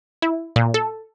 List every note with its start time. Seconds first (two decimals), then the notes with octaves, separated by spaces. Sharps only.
0.22 E4
0.56 A#2
0.74 A4